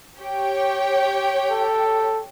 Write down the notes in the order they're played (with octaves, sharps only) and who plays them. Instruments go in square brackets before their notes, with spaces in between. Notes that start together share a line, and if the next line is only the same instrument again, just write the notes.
[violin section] G4 C#5 G5
[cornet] A4